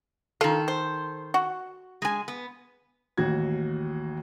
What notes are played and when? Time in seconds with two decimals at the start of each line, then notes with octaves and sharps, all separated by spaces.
0.41 D#3 F4 A4
0.68 C5
1.34 F#4
2.02 G#3 G#5
2.28 B3
3.17 A1 D#2 F#4 G#6